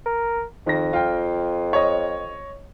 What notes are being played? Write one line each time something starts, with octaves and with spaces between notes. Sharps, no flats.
A#4
F2 D#3 A#6
F4 G5
C#5 D#5